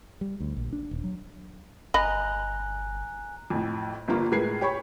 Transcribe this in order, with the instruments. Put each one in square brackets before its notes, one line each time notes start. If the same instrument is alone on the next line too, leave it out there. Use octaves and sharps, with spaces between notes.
[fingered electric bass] G3
D2
A#1
D4
D#1
F#3
[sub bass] G1 [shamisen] D#5 B5 [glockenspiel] G#5 A#5 F#6
[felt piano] F2 A2
G1 G2 F3 A#3 F4
A2 G#3 A#4 B4 G#6 C7
G4 C#5 B5 C#6